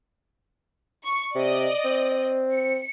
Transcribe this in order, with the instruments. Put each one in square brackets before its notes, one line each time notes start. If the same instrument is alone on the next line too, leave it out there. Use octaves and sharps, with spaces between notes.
[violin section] C#6
[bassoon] C3 [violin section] D5 D#5
[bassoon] C4
[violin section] C#7